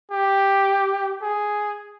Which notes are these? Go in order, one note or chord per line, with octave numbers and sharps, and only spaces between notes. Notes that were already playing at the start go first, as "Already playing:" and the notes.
G4
G#4